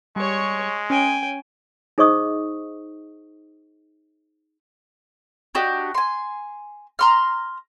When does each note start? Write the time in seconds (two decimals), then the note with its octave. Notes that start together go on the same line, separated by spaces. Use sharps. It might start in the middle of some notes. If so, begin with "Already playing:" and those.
0.16 G3 G#3 C#5 C#6
0.90 C#4 G5 G#5
1.98 D#4 G#4 C5 D#5 C#6 D#6
5.55 D4 F#4 G4 D#5
5.94 G#5 C6
6.99 A#5 C6 F6